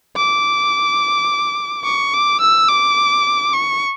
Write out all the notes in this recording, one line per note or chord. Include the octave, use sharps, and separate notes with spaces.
D6
C#6
D6
E6
D6
C#6